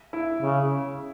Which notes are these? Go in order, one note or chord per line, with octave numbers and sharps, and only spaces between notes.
E4
C#3